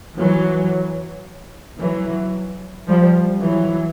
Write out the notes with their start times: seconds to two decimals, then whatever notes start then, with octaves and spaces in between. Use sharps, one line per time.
0.17 E3 F#3
1.80 E3 F#3
2.88 F3 G3
3.42 E3 F#3